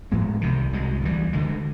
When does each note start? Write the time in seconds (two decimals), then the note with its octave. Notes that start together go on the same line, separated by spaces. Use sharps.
0.12 A2 F3 G#3 B3
0.41 C2 C3 D#3
0.73 C2 B2 G#3
1.02 D2 C#3 E3 G3
1.33 D2 D3 F3 G#3